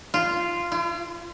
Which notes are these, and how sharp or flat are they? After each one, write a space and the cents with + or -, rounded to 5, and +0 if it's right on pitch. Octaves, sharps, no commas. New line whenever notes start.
F4 -10
F4 -45